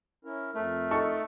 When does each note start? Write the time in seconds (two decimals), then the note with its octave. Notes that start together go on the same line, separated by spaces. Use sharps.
0.25 C#4 E4 A#4
0.54 F2 A3 A#4
0.91 D#4 A4 C#6